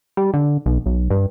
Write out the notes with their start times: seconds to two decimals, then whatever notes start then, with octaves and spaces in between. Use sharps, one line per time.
0.17 G3
0.34 D3
0.66 B1
0.86 B1
1.10 G2